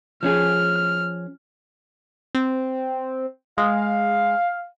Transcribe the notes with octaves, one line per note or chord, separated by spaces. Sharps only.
F3 C#4 G#4 F6
C4
G#3 F5